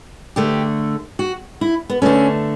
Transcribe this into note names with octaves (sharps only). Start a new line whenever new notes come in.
D3 A3 G4
F#4
E4
B3
D3 A3 C#4